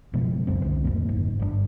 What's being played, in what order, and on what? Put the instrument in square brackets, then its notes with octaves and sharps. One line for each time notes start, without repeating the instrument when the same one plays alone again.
[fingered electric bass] F#1 B2 F3 G#3
D#1 C#2 F#2 C4
C2 D3
D#1 A1 F2 A#3
F#1 G#2
G1 D#3 D4